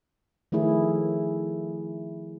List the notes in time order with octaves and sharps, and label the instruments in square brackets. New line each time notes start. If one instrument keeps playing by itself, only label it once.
[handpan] D#3 F3 A3 E4 G#4